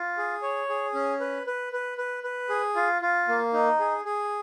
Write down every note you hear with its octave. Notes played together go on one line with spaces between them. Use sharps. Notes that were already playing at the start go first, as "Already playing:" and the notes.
Already playing: F4
G#4
C#5
G#4
C#4
B4
B4
B4
B4
B4
G#4
F4
F4
A#3
D#4
G#4
G#4